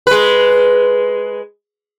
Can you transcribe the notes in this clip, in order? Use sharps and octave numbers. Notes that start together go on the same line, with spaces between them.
G#3 B4